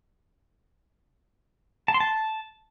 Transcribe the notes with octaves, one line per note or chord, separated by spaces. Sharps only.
A5
C6
A5